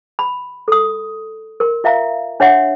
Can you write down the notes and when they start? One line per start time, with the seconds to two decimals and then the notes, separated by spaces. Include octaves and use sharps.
0.19 B5
0.68 A4 D#6
1.60 A#4 C6
1.84 F4 E5 F5 A#5
2.40 D4 C#5 E5 F#5 C6